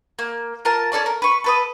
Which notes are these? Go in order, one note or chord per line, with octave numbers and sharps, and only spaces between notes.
A#3
F4 A#4 A5
C#4 A4 D5 A5
A#4
B4 C#6
A4 B4 D#6